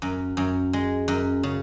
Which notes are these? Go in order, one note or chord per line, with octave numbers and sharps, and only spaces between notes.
F#2
F#2
G#3
F#2
C#3